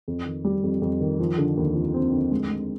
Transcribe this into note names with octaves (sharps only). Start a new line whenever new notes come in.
F2
D#3
G3
F2
F2
D#3
F3
D3
D#2
F3
C4
D3
G#3
G#3